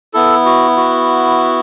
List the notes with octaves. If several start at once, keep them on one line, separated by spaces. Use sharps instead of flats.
B3 E4 A4
F#4
F#4